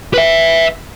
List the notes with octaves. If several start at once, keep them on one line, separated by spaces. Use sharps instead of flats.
B4 E5